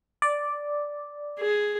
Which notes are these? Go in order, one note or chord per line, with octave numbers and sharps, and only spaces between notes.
D5
G#4